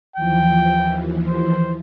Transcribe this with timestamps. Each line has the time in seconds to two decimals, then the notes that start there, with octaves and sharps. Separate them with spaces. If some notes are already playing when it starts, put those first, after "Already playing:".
0.16 D#2 E3 F3 G5
1.28 C5